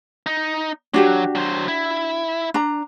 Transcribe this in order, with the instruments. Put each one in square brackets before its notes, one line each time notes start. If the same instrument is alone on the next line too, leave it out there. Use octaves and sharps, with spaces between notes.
[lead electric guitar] D#4
[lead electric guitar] F#3 [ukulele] D4 F#4 G4
[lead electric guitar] F#3 C5
E4
[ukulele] D4 A#5